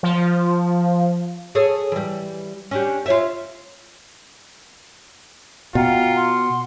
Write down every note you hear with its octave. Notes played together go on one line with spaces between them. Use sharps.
F3
G#4 A4 C#5
E3 G3
C#4 D4 G4
F4 C#5 E5
B2 F4 F#5 G5 A#5
F#5 C6